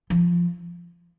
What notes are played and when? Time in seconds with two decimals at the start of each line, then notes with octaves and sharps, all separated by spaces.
0.10 F3